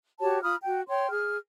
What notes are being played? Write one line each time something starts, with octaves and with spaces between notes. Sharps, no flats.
F#4 G4 C#5 A5
F4 B5 D#6 F6
F#4 G5
C#5 G5 C6
G#4 F6